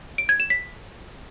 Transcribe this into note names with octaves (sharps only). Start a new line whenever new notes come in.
D7
G#6
E7
B6